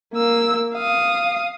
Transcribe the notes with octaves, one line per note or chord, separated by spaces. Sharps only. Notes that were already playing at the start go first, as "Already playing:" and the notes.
A#3 E6
F5 D#6